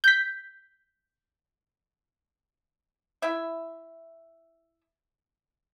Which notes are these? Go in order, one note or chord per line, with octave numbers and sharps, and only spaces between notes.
G6 B6
E4 E5